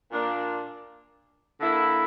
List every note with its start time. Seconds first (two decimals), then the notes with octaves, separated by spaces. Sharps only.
0.10 A#2 A#3 D4
1.59 D3 A#3 E4